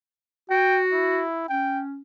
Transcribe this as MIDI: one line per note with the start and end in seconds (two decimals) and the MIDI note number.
0.50 1.23 66
0.50 0.80 79
0.92 1.47 64
1.49 2.01 61
1.49 1.82 79